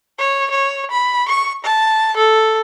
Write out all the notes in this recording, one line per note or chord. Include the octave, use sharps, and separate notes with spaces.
C#5
C#5
B5
C#6
A5
A4